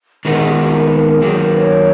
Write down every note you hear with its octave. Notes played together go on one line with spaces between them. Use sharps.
D#3 G#3 B3 D#4 A#4
G#4
F4
F#4
A#4
B4
A#4
A#4
D#3 F#3 A#3 G#4
B4
C#5